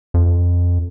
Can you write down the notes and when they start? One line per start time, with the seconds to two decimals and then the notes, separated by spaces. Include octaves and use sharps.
0.14 F2